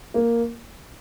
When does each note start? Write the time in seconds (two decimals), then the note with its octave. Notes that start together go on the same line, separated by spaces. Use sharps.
0.14 A#3